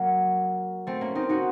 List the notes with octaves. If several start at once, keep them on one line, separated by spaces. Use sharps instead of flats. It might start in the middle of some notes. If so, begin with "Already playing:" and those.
Already playing: F#3 A#3
A3 C4
A#3 C#4
C4 D#4
D#4 F#4